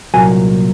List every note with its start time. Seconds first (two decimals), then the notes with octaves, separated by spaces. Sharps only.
0.14 C2 A#2 F#3 A#3 G#5